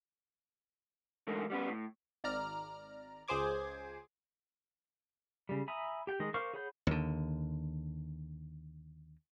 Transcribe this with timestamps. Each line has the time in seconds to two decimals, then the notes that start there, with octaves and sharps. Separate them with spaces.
1.27 D3 E3 G#3 A3 D#4 A#4
1.50 G3 B3 C#4 B4
1.69 A2
2.24 G#1 D5 A#5 F6
3.28 C#2 G#4 C5 D6 G#6
5.49 C#3 G3
5.68 E5 G#5 A#5 B5 D#6
6.07 G4 G5
6.20 D#3 G#3 D#5
6.34 A#4 C5 F5 C#6 D6
6.54 G#4 C#5 F#5 B5 G6
6.87 D#2 D3